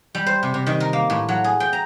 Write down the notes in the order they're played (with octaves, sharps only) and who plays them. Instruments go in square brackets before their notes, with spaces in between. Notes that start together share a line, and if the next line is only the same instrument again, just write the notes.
[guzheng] G3
C5
C3
C3
D#3
A#4
A#3
A2
F#3
G#4
G5
A#5